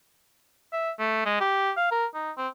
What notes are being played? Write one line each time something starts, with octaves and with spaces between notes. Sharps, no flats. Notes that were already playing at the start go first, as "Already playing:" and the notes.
E5
A3
G#3
G4
F5
A#4
D#4
C4